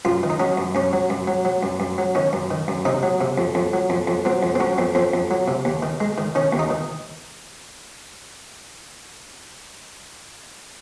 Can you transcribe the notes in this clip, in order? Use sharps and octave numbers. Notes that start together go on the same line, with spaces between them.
F#2 F4
D#3
D#4
F#3 C#4
F#2
F#2 C#4
F#3
F#2
F#3
F#3
F#2
F#2
F#3
D#3 C#4
F#2
D#3
F#2
C3 D#4
F#3
C3
F2
F2
F#3
F2
F2
F#3 C4
F2
C4
F#3 C#4
F2 C4
F2 C4
F2
F#3
C3
D#2
D#3
G#3
D#3
D#3 C#4
D#2
D#4
D#3